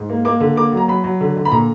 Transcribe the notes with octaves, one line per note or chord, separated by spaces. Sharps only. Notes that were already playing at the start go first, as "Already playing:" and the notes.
Already playing: G#2
A#3
A#3 D6
D3
A#3 D6
F#3
A#5
F#3 B5
F#3
D3
D3
B5
A#2 A#5